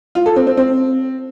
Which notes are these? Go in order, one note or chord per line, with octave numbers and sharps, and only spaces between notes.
F4
A4
C4
C4
C4